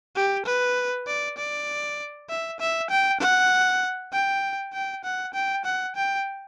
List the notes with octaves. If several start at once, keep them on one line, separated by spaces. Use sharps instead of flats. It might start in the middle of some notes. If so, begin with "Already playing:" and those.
G4
B4
D5
D5
E5
E5
G5
F#5
G5
G5
F#5
G5
F#5
G5